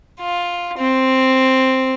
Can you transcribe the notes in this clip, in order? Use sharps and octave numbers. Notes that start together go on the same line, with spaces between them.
F4
C4